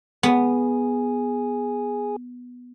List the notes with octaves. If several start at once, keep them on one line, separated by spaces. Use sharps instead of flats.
B3 G#4